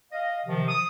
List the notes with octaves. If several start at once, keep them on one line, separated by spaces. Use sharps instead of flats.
D#5 F5
C3 D#3 F3
D#6